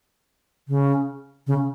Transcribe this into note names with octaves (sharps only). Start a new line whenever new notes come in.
C#3
C#3